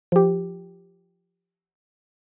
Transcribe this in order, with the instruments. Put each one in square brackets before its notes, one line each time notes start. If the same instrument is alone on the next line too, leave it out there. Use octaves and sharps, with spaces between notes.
[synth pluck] F3 G4